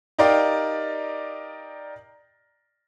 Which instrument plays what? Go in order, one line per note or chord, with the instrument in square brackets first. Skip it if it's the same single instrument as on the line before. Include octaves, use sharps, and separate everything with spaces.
[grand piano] D#4 G4 A#4 D5 F5